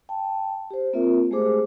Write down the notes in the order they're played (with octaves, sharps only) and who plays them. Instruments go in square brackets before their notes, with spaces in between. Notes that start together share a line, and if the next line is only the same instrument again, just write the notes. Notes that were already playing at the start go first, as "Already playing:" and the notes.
[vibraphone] G5 A5
G4 C5
A#3 C4 F4 A#4 E5
G#3 A3 G4 G#4 C5 D6